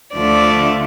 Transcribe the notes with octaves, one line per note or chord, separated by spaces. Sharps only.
D2 D3 F3 A3 D5